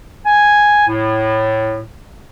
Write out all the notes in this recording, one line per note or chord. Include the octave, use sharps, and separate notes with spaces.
G#5
A2